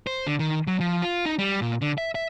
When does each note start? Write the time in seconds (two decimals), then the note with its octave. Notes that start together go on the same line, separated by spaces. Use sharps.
0.07 C5
0.27 D3
0.39 D#3
0.67 F#3
0.80 F3
1.02 F4
1.26 D#4
1.39 G3
1.61 A#2
1.82 D3
1.98 E5
2.15 E5